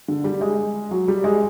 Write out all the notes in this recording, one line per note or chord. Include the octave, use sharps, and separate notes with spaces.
D3
G3
G#3
F#3
G3
G#3